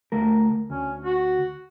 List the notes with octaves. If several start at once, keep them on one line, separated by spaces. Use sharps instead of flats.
D2 A3 A#4
D2 C#4
F#4